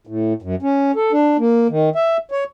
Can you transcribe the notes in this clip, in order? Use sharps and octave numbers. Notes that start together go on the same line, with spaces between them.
A2
F#2
C#4
A4
D4
A#3
D#3
E5
C#5